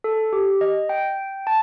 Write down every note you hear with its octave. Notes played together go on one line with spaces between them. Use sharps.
A4
G4
D#5
G5
A5